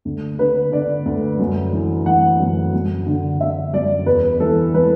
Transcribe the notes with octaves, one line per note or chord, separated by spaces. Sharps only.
D2
D3 B4
D3 D5
D2
F#2
E3
E3 F#5
F#2
F#2
D3
D3 E5
F#2 D5
E2 B4
E3 A4
E3 B4